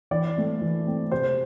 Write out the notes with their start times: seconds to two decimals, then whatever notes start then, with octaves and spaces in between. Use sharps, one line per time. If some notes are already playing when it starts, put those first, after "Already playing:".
0.11 E3 D5
0.36 A3 C4
0.61 E3
0.86 A3 C4
1.12 C3 C5